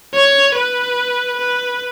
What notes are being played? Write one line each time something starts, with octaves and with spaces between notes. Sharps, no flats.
C#5
B4
B4